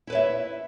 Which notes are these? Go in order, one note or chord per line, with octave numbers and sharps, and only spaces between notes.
E4 B4 C#5 E5